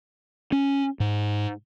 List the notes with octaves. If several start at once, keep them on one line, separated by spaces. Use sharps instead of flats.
C#4
G#2